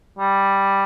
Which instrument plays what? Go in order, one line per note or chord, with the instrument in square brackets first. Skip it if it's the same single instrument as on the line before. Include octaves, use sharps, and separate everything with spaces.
[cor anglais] G3